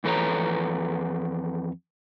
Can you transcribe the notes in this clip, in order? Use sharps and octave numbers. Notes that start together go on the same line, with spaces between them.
F2 E3 A4 B4 C#5 A#5